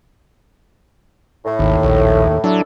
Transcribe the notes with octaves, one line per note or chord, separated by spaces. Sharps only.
A2
G#1 D#2
A#1
F#3 D4 E4 A4